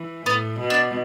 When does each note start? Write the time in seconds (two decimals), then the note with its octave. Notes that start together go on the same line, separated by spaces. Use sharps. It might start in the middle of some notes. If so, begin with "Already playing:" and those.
Already playing: E3
0.26 A2 B3
0.60 B2
0.70 D4